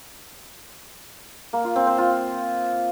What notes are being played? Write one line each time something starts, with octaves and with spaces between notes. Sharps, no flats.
A#3
F4
C4
C5
F4